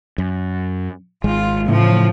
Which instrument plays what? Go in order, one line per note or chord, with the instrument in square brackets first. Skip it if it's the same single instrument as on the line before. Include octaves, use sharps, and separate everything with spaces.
[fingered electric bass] F#2
[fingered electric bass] G#1 G#3 [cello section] F4
[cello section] A2 F3 [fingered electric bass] C#3 E3